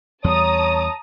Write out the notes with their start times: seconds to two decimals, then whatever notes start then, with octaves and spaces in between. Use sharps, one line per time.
0.24 E2 G3 C#5 A5 A#5 D#6